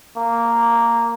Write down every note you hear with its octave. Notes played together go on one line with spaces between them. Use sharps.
A#3